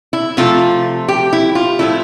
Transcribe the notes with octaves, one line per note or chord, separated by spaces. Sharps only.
E4
C3 F3 A3 F4
G4
E4
F4
A2 F3 A3 E4